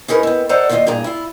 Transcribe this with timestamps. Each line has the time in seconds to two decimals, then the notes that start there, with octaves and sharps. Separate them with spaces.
0.08 C#4 D#4 G#4 A#4 B4
0.23 B3 C4
0.49 A4 C5 D5 D#5 F#5 A#5
0.69 D#2 D#3 C4 E4 F4 D#5
0.87 G2 A#2 G#4 A#5
1.04 E4 F4